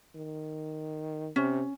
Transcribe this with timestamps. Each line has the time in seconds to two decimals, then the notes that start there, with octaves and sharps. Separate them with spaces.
0.15 D#3
1.36 C3 C#4